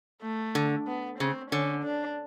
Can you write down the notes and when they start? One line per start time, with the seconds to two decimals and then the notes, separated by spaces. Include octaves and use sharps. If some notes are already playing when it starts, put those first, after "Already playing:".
0.23 A3
0.55 D3
0.87 B3
1.19 C#3 C4
1.52 D3 C#4
1.84 D4